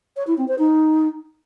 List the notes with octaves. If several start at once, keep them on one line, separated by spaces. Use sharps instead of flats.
C#5
E4
C4
C5
D#4